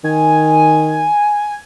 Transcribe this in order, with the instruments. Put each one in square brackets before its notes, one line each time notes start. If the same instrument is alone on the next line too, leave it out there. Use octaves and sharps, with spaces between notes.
[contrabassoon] D#3 [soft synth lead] G#5